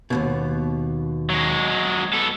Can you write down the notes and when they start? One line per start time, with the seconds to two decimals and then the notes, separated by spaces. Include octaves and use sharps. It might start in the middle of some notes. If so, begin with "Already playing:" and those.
0.10 D#2 G#2 B2
1.30 F#3 G#3
2.14 B3 A4